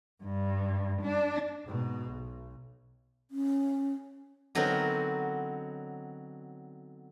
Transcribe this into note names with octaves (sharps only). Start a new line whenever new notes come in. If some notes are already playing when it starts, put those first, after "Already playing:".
G2
D4
G#2 B2
B1
C#4
D3 F#3 B3 C4 D#4 A#4